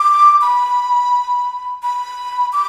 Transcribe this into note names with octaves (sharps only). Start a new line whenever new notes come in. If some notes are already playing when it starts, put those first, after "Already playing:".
Already playing: D6
B5
B5
D6